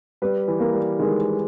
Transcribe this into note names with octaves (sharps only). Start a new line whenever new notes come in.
G3 B4
E3
A#3
G3
D#3 G#3